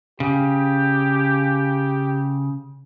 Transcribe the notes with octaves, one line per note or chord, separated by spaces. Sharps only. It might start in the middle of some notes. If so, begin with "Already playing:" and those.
C#3 G4